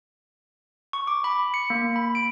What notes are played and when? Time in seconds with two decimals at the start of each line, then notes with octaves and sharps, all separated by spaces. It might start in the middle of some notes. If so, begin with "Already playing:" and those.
0.93 C#6
1.07 D6
1.24 B5
1.54 C#7
1.70 A#3
1.96 B5
2.15 D7